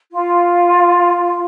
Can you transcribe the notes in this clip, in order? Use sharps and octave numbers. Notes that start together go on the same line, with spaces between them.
F4